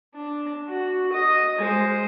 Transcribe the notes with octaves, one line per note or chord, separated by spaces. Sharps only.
D4
F#4
D#5
G#3 C5